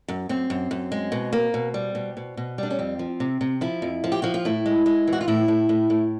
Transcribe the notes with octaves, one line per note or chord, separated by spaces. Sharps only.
F#2
F#2 C4
F#2
F#2
G#3
B2
A#3
B2
G3
B2
B2
B2
G3 D4
C#4
F2 C4
F3
C3
C3
F3 E4
F2
F3
G4
F3 F#4
F4
A2 E4
G#3
G#3
E3
F#4
F4
A2 E4
A2
A2
A2